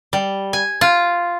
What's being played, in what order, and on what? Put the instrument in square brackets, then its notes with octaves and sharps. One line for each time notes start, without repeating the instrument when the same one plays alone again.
[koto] G3
G#5
F4